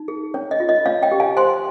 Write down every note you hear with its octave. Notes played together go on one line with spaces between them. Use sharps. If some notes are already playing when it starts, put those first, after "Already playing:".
Already playing: D#4
G#4
C#4 C#5
D#5
F4
D#5
C#4 C#5 F5
D#5 G5
G4
F5 G#5
C5 G#5 C6